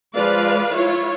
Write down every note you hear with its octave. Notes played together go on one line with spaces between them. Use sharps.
F3 G#3 B4 D5 F5
E4 F4 C#5